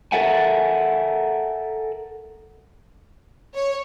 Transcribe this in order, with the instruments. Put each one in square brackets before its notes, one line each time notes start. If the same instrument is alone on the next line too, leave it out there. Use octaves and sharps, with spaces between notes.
[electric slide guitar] A4 A#4 E5 F#5 G#5
[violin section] C#5